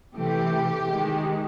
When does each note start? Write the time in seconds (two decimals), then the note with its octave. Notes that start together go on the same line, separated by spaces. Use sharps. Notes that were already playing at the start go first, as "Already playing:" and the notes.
0.16 C3 E3 A3 G4
0.89 D#3 G#3